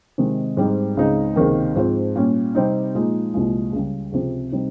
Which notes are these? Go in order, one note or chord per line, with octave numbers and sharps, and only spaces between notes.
C3 D#3 G#3 D#4
G#2 G3 C4 D#4
C#2 C#3 G#3 C4 D#4
C#2 C3 D#3 A#3
G#2 F3 C4
A#2 G3 C#4
C3 G3 C4 D#4
A#2 F3 G#3 D#4
C2 A#2 F3 G#3
C#2 C#3 G3
C#2 C3 F3 C4
C3 G3 C4 D#4